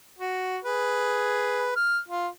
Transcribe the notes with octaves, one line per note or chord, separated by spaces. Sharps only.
F#4
G#4 B4
F6
F4